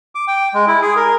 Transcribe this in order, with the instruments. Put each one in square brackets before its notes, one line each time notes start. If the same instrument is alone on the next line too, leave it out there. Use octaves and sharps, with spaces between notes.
[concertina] D6
G5
G#3
E4
G#4
A#4